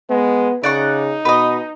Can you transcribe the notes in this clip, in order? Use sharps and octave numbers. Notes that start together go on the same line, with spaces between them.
G#3 B3
C#3 D#4 D5 F#5 C#6
B2 B4 D#5